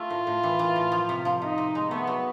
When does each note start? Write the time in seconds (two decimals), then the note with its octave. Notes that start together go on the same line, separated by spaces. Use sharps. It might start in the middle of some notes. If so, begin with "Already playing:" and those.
Already playing: A3 F4
0.10 A2
0.27 A2
0.43 E3
0.59 E3
0.76 A2
0.92 F3
1.09 C3
1.25 F3
1.42 C3 D#4
1.58 C3
1.75 G#3
1.90 A3 B3
2.07 F#3